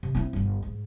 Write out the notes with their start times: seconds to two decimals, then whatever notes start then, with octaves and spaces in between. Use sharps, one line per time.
0.03 C3
0.15 C4 E4
0.33 D1 G1
0.63 G#2